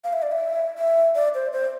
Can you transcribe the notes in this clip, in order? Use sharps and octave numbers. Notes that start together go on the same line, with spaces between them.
F5
E5
D5
E5
E5
D5
C5
C5